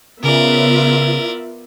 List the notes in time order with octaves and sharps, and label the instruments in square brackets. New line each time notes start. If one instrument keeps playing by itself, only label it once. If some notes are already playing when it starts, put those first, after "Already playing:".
[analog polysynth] C#3 [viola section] B3 F4 E5 [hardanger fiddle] A#4 D5